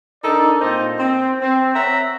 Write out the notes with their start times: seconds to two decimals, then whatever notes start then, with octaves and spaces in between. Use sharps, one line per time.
0.24 D4 D#4 A4 A#4 D5
0.61 A#2 C4 D#4 C5 D#5
0.99 C4
1.41 C4
1.75 C#5 E5 F#5 A#5